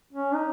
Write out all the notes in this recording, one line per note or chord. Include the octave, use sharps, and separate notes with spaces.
C#4
D#4